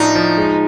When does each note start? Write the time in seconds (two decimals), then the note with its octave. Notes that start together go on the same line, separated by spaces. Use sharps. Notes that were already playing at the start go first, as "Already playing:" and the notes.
Already playing: A2 F3 D4 D#4
0.15 F3
0.37 G#3